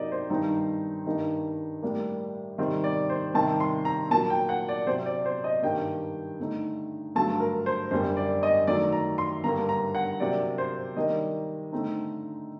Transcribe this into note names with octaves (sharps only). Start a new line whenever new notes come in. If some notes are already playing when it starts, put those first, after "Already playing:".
Already playing: C3 F#3 A#3 D#4 D5 D#5
C5
G2 D#3 G3 C4 D#4
G2 D#3 G3 A#3 D#4
A2 G3 A#3 D4
C3 D#3 G3 C4
D5
C5
C3 D#3 G3 C4 A5
C6
A#5
A#2 F#3 A#3 A5
G5
F#5
D5
C3 F#3 C4 C5
D5
C5
D#5
G2 D#3 G3 A#3 G5
D3 A3 D#4
G2 D3 F#3 A3 A5
A#4
C5
F#2 D3 G3 A#3 C5
D5
D#5
D#3 F#3 A3 D5
A#5
C6
G2 D3 G3 A#3 A#5
A#5
F#5
C3 F#3 A#3 D4 D5
C5
D#3 G3 A#3 D4 D#5
D3 A3 C4 D#4